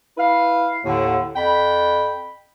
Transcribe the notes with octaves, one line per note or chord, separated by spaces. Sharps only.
E4 B4 F5
D#2 A2 D3
F2 G5 B5